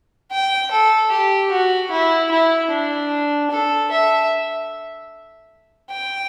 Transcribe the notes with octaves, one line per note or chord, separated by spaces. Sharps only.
G5
A4
G4
F#4
E4
E4
D4
A4
E5
G5